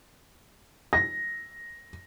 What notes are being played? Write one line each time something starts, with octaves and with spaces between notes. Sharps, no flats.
A#6